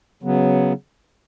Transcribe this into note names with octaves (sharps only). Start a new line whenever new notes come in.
C#3 F#3 B3